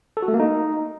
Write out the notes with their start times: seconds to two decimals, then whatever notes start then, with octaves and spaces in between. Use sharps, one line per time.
0.17 A4
0.22 F#4
0.28 A3
0.34 A#3
0.39 D#4